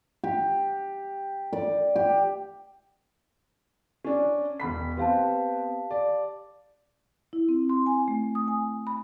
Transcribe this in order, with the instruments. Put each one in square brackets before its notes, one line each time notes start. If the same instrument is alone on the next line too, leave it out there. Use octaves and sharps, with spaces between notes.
[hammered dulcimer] G4
D5
G4
[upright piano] C#4 D4
E1 B5 B6
[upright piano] B3 C4 [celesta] G4 F5 A5
[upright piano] D5
[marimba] E4
C4
C6
G#5
A3
D#6
G#5
B5